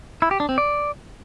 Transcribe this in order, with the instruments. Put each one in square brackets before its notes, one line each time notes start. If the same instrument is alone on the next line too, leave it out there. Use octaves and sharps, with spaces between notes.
[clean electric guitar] E4
G4
D4
C4
D5